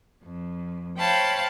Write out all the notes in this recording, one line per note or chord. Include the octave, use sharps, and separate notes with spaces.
F2
C5 C#5 F5 G5 A5 B5